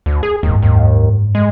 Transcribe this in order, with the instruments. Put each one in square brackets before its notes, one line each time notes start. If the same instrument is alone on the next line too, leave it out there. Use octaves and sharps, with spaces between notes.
[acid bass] D2
G#4
[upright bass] F#1 G#2 [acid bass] D#2
[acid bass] D#2
G#3